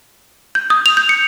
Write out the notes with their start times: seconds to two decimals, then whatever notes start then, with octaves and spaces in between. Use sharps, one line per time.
0.55 G6
0.70 D#6
0.86 F7
0.97 G6
1.09 C#7